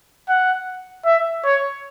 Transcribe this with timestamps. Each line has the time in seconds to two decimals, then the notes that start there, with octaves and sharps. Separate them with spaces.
0.28 F#5
1.05 E5
1.44 C#5